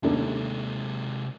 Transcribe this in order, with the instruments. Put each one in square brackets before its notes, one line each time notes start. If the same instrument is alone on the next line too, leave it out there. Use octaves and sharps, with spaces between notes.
[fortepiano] D#2 A3 D4 [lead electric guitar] C3 G#3